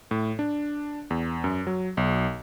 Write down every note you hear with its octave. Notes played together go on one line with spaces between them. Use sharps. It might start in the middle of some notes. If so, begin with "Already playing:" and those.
A2
D4
E2
F#2
F#3
B1